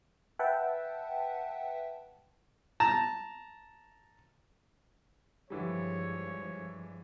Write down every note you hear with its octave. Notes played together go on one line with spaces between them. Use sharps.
B4 E5 F#5 G5 A5
A5 A#5
G2 D3 E3 F3 G3 G#3 C#5